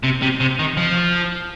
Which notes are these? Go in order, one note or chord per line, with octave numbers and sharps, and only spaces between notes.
C3
C3
C3
D#3
F3